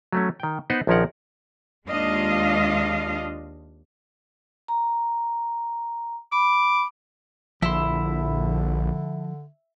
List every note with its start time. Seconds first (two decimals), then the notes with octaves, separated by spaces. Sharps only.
0.12 F#3 A3 C#4
0.40 D#3 G5
0.70 B3 D#4 B4 C5 F#5
0.87 A#1 D#3 F3 C#4 A#4 F#5
1.88 D#2 G#3 D4 F4 D#5 F5
4.68 A#5
6.32 B5 D6
7.62 A#1 D3 F3 E4 C6